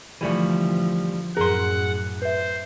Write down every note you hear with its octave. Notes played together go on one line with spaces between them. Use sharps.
D3 E3 F3 G3 A3
F#2 A2 G#4 A#4 F#5 C6
B4 C5 E5